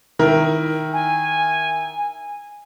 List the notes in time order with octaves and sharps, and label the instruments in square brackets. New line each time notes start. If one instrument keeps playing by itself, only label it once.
[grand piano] D#3 E4 A#4
[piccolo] G#5